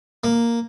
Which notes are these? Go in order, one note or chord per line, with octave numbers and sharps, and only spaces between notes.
A#3